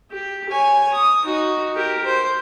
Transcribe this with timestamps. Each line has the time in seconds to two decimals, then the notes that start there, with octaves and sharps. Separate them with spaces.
0.11 G4
0.49 C#5 G#5
0.94 D#6
1.25 D#4 F#4
1.76 G4 A#4
2.04 C5